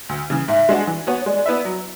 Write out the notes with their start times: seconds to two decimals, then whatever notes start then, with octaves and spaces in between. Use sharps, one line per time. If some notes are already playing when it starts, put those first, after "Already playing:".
0.09 D2
0.30 C#3 E3
0.48 G#2 E5
0.69 G#3 D4 F#4
0.88 E3
1.07 B3 F#4 C#5
1.22 C#5
1.26 G#3 D5
1.46 B3 E4 B4 E5
1.65 F#3